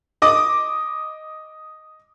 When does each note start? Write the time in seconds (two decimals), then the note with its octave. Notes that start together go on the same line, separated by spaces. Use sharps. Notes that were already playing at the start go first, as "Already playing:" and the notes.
0.22 D#5 D6 D#6